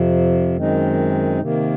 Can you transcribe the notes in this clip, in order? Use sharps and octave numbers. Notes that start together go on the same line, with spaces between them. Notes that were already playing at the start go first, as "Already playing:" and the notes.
Already playing: F2 C3 F3
F#2 D#3 G#3 C4 D#4
C3 D#3 A#3